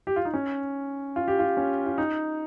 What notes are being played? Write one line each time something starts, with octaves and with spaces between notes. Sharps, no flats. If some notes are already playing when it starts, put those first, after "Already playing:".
G4
F4
D#4
C#4
F4
G4
F4
C#4
F4
D#4